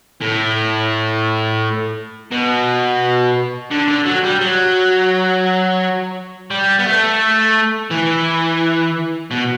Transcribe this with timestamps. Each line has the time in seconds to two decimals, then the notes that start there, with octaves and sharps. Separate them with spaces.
0.21 A2
2.31 B2
3.71 D3
3.88 D3
4.06 F#3
4.24 G3
4.41 F#3
6.51 G3
6.79 B3
6.86 A3
7.91 E3
9.31 B2